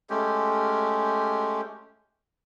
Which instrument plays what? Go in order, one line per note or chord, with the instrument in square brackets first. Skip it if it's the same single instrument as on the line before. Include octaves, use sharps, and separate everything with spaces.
[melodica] G#3 A3 C#4 G4